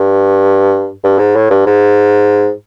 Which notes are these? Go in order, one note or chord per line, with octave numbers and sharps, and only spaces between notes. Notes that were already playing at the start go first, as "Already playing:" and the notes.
Already playing: G2
G2
G#2
A2
G2
G#2